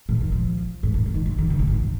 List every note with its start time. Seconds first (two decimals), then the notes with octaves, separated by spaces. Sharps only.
0.09 A#2
0.21 D#3
0.32 F3
0.83 G#2
0.94 A#2
1.04 C#3
1.14 D#3
1.26 F3
1.39 D#3
1.50 C#3
1.59 A#2
1.67 G#2